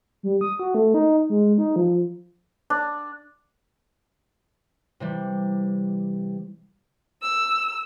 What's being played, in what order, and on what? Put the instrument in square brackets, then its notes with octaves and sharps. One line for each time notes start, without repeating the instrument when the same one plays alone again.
[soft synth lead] G3
D#6
F#4
A3
D#4
G#3
D#4
F3
[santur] D4
[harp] C3 E3 G3
[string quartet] E6